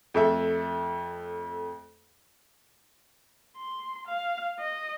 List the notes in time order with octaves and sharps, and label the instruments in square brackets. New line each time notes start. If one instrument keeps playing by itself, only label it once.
[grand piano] F2 A3 E5
[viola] C6
F5
D#5